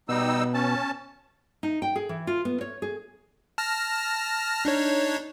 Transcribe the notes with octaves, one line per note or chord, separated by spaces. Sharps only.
B2 G3 B3 D#4 E6
C#4 A5
D#4
G5
G#4
E3
F4
B3
C#5
G#4
A5 F6 A#6
D4 D#4 C#5